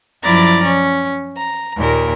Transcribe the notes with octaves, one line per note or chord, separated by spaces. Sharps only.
F#2 F3 E4 D5 A#5 A6
C#4
A#5
D#2 A#2 A#4